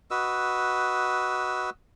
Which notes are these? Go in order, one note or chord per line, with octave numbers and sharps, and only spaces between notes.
F#4 B4 D#5 E6